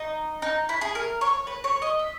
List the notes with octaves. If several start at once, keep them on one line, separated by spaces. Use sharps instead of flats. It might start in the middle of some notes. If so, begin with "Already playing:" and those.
Already playing: D#4
D#4
E4
G#4
A#4
C#5
B4
C#5
D#5
E5